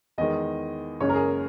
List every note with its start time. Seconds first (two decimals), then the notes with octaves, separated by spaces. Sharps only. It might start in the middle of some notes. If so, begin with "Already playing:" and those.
0.18 E2 D#3 G#3 D#5
1.00 F#1 F#2 C#3 G#3 C#5
1.09 A#4
1.15 G#4